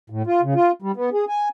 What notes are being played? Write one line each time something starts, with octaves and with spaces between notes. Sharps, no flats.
A2
F4
C#3
F4
G3
B3
G#4
G#5